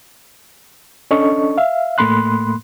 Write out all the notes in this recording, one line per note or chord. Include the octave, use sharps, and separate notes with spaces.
C#4 D4 A4 D#5 C#6
E5 F5
A2 A3 A#3 B5 C6 F#6